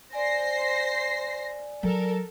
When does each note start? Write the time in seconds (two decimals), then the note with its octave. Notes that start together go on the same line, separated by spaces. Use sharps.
0.13 C5 D5 G#5 A#6 C7
1.83 F#3 A4 A#4